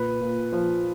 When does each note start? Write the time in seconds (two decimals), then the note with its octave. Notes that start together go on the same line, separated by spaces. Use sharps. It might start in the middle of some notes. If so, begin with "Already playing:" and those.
Already playing: A#2 B4
0.21 A#2
0.53 F3